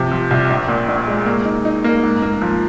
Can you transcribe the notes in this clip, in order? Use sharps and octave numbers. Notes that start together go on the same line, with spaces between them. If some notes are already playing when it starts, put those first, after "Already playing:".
Already playing: C3 F3
F3
C2
A#1
A#2
A#1
G#3
A#3
D#4
D#4
A#3
G#2
A#3
F3